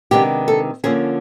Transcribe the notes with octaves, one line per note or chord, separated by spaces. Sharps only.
C3 D#3 G#3 B3 D4 G4
A4
D3 F3 A#3 C#4 G#4